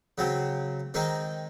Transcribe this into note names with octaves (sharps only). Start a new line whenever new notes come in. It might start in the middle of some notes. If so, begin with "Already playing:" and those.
C#3 F#3 C4
D#3 G#3 C4 D#4